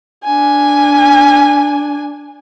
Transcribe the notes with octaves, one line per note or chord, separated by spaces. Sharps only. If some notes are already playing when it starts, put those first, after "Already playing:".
D4 G#5